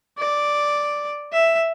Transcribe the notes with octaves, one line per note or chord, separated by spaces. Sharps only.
D5
E5